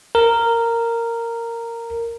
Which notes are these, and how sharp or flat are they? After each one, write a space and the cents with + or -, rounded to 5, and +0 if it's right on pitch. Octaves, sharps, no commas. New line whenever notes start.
A#4 -10